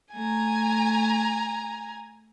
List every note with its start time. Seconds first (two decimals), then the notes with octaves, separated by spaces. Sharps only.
0.14 A3 G#5 A#5